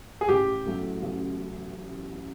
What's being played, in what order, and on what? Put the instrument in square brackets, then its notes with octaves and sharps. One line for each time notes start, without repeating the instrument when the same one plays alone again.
[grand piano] G#4
[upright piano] A1 [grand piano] G4
[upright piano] A2 F#3 A3 C#4
A1